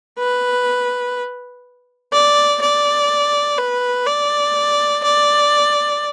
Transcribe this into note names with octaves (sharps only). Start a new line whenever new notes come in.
B4
D5
D5
B4
D5
D5